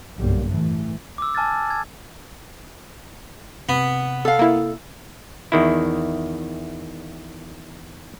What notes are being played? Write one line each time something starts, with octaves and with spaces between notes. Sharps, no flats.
F#1 B1 G2 G3 A#3
A1 E3 A3
D6 E6
G#5 A5 F6 G#6 A6
G#6
C3 B3
A4 F5
A#3 E4
E2 D#3 E4